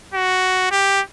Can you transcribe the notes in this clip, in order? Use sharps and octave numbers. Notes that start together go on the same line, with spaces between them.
F#4
G4